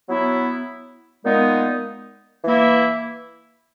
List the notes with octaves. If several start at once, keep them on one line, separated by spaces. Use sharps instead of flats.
F#3 B3 E4
A#2 G#3 B3 D#4
E3 A#3 E4